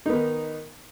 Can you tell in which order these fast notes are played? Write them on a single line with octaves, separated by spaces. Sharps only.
D#4 B3 D#3